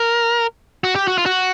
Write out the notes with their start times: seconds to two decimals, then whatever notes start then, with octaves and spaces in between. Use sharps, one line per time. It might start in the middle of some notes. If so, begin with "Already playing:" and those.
Already playing: A#4
0.84 F#4
0.95 G4
1.08 F#4
1.18 F4
1.26 F#4